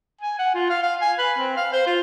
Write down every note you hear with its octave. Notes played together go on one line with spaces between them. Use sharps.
G#5
F#5
F4
F5
F5
G#5
B4
C4
F5
C5
F4